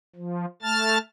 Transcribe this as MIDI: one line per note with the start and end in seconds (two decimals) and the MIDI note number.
0.16 0.46 53
0.62 0.98 57
0.62 0.98 81
0.62 0.98 89
0.62 0.98 93